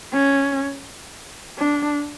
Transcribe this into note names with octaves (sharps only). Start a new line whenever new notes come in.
C#4
D4